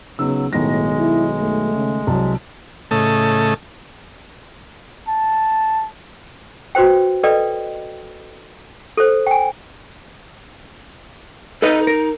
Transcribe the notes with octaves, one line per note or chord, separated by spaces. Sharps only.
C#3 F#3 B3 D#4 E6
B1 A2 D#3 G#3 B3 A#6
E4
A3
C#3
C2 F#3 A5
A2 C#3 A3 D#5 A5
A5
F#4 B4 C5 G5
A4 B4 D5 D#5 G5
A4 C5
G5 G#5
D#4 A4 B4 D#5
A#4